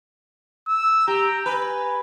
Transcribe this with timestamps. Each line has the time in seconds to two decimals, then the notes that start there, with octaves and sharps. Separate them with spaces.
0.68 E6
1.08 G4 A#5
1.46 B4 G#5